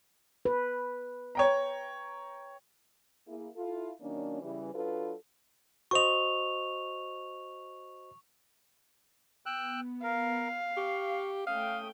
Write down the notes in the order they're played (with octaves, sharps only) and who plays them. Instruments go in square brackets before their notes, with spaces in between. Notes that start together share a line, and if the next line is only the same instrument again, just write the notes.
[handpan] B4
[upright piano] C#5 G5 A#5
[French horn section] A#3 E4 G#4
E4 F4 A4
D#3 F#3 A#3 C#4 D4
C#3 E3 G3
F#3 D4 F4 A4 B4
[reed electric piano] F#4 C5 D#5 [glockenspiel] C#6 F7
[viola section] B3 [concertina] G5 E6 F#6
[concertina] A#4 [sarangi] F5
[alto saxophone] G4 [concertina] C#6
[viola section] A3 C#4 G5 [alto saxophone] F5 [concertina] D#6